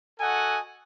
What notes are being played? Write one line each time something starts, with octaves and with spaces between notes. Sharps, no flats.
F#4 A4 D#5 F#5 G#5